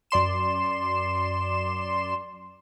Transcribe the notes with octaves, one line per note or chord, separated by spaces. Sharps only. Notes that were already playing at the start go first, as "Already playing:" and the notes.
F#2 D5 C6 E7